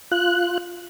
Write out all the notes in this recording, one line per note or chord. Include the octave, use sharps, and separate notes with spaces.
F4 F#6